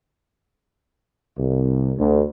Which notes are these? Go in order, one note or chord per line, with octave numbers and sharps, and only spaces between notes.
C2
D2